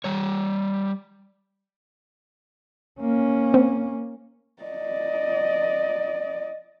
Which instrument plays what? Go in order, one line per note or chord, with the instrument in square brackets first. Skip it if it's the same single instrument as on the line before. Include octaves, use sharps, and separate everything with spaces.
[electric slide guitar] G3 C#5
[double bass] A#3 C#4
[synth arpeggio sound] C4
[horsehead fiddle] D5 D#5